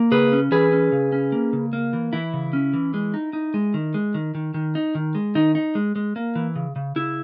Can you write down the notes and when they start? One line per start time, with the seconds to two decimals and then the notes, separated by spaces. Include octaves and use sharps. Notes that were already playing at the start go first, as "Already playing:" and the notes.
Already playing: A#3
0.12 C#3 G#4 B4
0.32 C#4
0.52 E3 G#4 B4
0.72 C#4
0.92 C#3
1.13 C#4
1.32 A#3
1.53 C#3
1.73 A#3
1.93 E3
2.13 E3 E4
2.34 C#3
2.53 C#4
2.73 E3
2.94 G#3
3.14 D#4
3.33 D#4
3.54 G#3
3.74 D#3
3.94 G#3
4.14 D#3
4.35 D#3
4.54 D#3
4.75 D#4
4.95 D#3
5.15 G#3
5.35 D#3 D#4
5.55 D#4
5.75 G#3
5.96 G#3
6.16 A#3
6.35 E3
6.56 C#3
6.76 C#3
6.96 C#3 E4